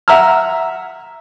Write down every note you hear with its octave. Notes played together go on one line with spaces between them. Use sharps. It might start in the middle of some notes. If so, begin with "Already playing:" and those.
E5 F#5 A#5 E6 F6